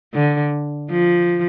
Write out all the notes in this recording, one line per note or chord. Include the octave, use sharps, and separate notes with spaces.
D3
F3